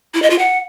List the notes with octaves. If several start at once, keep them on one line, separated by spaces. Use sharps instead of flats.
E4
D#5
F4
F#5